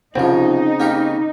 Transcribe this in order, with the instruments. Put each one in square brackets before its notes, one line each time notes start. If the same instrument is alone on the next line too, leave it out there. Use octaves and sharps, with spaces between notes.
[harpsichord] C2 F3 [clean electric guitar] C#3 C4 [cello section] D#4
[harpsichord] A#3 G4 A#4